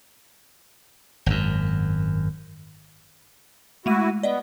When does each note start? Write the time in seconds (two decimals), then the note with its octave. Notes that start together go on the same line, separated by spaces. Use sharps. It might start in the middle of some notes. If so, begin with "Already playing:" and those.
1.26 G#1 F#2
3.86 G#3 A3 E4 F#4 D#7
4.23 B3 D5 D#5 F#5